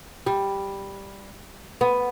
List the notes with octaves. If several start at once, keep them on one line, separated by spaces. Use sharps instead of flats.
G3
B3